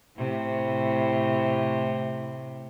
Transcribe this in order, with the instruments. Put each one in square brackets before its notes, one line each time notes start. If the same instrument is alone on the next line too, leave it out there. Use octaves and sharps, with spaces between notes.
[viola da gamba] A2 C3